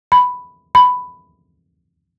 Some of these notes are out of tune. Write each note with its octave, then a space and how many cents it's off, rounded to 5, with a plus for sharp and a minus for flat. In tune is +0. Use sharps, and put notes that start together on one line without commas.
B5 +5
B5 +10